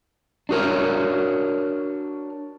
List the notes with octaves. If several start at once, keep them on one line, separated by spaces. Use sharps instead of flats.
D4 F#4 A#4 C#5